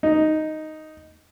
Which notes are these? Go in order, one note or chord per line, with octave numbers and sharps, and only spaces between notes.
D#4